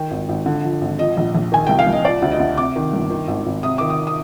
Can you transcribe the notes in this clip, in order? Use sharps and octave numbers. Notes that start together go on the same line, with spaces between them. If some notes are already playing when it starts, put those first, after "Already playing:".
Already playing: D#3 G5
G#1
G#1
D3
F3
G#1
F3 D#5
A#1
A#1
D#3 G#5
C2 G5
F5
C2
D#5
F3 D5
D2
D#5
D2
C3 D6
D#3
G1
D#3
G#1
G#1
C3 D#6
D#3 D6
D#6
D#6